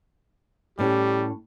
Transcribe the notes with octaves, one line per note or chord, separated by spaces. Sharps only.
A2 G3 C#4 G4